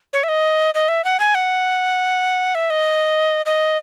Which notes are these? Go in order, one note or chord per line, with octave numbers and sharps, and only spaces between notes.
C#5
E5
D#5
D#5
E5
F#5
G#5
F#5
E5
D#5
D#5